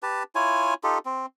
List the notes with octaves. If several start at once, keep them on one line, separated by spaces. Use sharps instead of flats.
G4 B4 A5
E4 F4 C#5 G#5
D#4 F4 G4 A4
C4